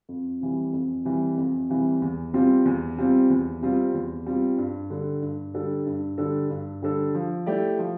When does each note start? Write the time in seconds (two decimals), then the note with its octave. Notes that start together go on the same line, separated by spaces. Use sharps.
0.09 F2
0.41 C3 E3 G3
0.73 F2
1.05 C3 E3 G3
1.38 F2
1.70 C3 E3 G3
2.02 E2
2.34 C3 G3 C4 F4
2.65 E2
2.97 C3 G3 C4 F4
3.30 E2
3.62 C3 G3 C4 F4
3.94 E2
4.26 C3 G3 C4 F4
4.58 G2
4.90 D3 G3 D4 A4
5.22 G2
5.54 D3 G3 D4 A4
5.86 G2
6.18 D3 G3 D4 A4
6.50 G2
6.82 D3 G3 D4 A4
7.14 F3
7.46 A3 E4 G4 D5
7.79 F3